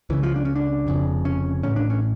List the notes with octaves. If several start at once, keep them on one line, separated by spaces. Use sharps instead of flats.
C#2 C#3 E3
F3
D4
C#4
D4
F1 F2 C#3
C#4
A1 A2 C#4
D4
C#4